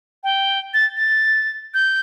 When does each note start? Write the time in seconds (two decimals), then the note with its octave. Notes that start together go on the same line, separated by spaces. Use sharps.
0.24 G5
0.74 A6
0.97 A6
1.74 G6